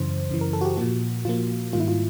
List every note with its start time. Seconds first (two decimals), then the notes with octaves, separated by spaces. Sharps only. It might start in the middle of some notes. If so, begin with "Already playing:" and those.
Already playing: F#2 C#3 E3 C5
0.30 F#2 C#3 E3
0.41 A#4
0.53 A4
0.61 F#4
0.65 G4
0.77 A#2 F3 A#3 F#4
1.25 A#2 F3 A#3 F4
1.73 G#2 D#3 G3 A#3 F4
1.80 E4
1.88 F4